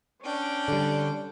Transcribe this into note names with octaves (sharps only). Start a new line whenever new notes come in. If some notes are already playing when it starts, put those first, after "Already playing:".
C#4 D4 G5
D3 G3